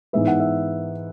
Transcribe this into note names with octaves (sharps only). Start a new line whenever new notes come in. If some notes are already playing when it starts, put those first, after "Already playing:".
G#2 E3 G#3 B3 E5
F#5
E5